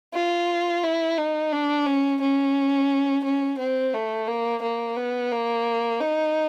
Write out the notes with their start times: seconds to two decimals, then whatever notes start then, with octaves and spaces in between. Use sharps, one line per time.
0.14 F4
0.84 E4
1.18 D#4
1.53 D4
1.86 C#4
2.21 C#4
3.24 C#4
3.58 C4
3.94 A3
4.27 A#3
4.62 A#3
4.97 B3
5.32 A#3
6.00 D#4